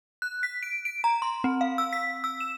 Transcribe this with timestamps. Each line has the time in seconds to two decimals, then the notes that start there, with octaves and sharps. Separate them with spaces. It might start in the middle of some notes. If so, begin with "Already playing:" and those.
0.22 F#6
0.43 B6
0.63 D7
0.85 D7
1.04 A#5
1.22 C6
1.44 C4
1.61 F5
1.78 E6
1.93 B6
2.24 E6
2.40 E7